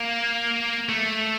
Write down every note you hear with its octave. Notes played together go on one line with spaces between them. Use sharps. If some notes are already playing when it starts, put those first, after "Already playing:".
Already playing: A#3
A3